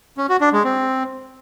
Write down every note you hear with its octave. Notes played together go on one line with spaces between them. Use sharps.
C#4
F#4
D4
G#3
C4